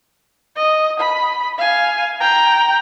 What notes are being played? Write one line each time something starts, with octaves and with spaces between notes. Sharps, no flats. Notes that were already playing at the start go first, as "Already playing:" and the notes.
D#5
B5
F5 G#5
G5 A#5